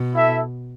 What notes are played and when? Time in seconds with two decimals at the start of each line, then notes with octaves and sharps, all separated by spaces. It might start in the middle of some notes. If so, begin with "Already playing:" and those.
Already playing: B2
0.14 E4 A4 E5